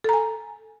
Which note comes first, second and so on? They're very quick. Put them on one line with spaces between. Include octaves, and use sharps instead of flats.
A4 A#5 G#5